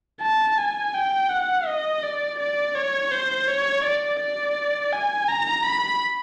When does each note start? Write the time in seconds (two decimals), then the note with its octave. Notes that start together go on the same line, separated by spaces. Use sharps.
0.21 A5
0.58 G#5
0.94 G5
1.29 F#5
1.67 D#5
2.03 D5
2.39 D5
2.75 C#5
3.12 C5
3.47 C#5
3.84 D5
4.20 D5
4.92 G#5
5.28 A#5
5.64 B5